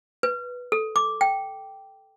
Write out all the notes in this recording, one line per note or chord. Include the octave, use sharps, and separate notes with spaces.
B4
A4
D6
G5